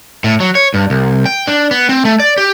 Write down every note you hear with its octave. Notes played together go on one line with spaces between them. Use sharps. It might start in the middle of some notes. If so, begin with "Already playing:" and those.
A2
F#3
C#5
G2
C2
G5
D4
B3
C4
A3
D5
G4